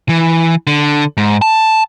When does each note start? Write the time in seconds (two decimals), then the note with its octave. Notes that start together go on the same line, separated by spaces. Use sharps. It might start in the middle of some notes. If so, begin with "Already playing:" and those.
0.09 E3
0.67 D3
1.17 G#2
1.42 A5